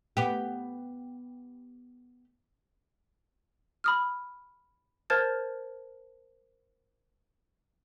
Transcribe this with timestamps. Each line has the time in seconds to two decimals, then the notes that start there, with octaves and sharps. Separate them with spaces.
0.17 B3 G4
3.84 B5 D#6 F6
5.10 A#4 C5 A5 F6 G#6 A6